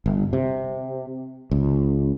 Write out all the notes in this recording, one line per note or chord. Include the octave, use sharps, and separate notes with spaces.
G1
C3
C#2